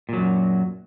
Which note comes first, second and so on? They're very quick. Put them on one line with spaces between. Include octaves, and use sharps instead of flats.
A#2 F#3 F#2